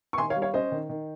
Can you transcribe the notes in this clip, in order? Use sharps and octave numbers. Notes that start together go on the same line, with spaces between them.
C#6
D#3 G#5 C6
C#5 F5
G3
C#5 F5
C#4 C5 D#5
D#3
D#3